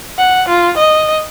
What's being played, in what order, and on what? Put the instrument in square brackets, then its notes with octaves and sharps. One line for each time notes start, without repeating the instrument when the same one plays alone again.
[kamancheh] F#5
F4
D#5